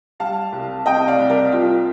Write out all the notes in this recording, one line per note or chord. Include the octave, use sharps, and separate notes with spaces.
G3 F5 A5
C2
C3 D#5 G5
D5 F5
C2
A#4 D5
G3 F4